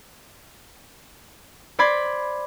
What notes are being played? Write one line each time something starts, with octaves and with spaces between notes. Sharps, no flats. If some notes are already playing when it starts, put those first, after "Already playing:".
C5 D5 B5 G#6